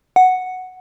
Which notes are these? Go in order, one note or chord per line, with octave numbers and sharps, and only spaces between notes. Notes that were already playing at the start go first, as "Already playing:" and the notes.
F#5